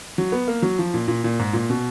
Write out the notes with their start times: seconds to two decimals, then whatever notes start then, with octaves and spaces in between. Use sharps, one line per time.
0.18 F#3
0.32 B3
0.48 A#3
0.62 F#3
0.79 F3
0.94 A#2
1.08 A#2
1.24 A#2
1.39 G#2
1.53 A#2
1.70 B2